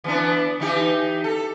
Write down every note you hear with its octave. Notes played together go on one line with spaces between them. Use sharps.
E3 B3 D4
E3 D#4 G4
A4